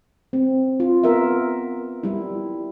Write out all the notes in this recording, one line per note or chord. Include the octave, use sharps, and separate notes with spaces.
C4
F4
B3 A#4 E5
G3 E4